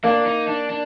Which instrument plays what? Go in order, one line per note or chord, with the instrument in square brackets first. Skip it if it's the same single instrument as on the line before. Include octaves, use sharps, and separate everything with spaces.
[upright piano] A#3 [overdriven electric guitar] D4
[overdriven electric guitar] D#4
D4
D4